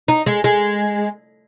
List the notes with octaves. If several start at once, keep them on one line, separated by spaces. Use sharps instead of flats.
D#4
G#3
G#3